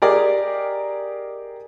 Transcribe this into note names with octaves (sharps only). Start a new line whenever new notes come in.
G4 G#4 A#4 D5 D#5